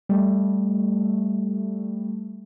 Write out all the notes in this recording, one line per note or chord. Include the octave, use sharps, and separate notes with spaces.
G3 A3